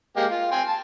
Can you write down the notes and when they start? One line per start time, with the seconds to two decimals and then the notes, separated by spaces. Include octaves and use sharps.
0.17 G#3 A#3 G4
0.30 F4
0.51 G5 G#5 C6
0.68 A5